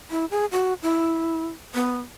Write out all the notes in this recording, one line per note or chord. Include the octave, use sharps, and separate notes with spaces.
E4
G#4
F#4
E4
B3